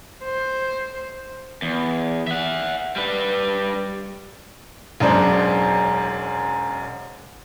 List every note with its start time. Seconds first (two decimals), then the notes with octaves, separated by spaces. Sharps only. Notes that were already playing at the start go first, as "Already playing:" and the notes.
0.24 C5
1.62 E2
2.27 E5 F#5
2.96 G3 B4
5.00 E1 F#2 G#3 D4 C5